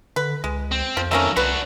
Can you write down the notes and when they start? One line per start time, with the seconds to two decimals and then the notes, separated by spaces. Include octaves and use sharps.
0.16 D3 B4
0.44 C#2 G#3
0.72 C4
0.97 F2 F3
1.11 D#3 F#3 A3 A#3 C#4
1.37 C2 D4 F#4 B4